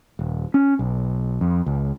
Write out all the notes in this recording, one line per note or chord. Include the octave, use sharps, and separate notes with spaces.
D#1
C#4
B1
F2
C#2